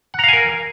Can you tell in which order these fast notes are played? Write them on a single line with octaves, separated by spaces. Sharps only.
F#5 A#5 F5 G#5 A#4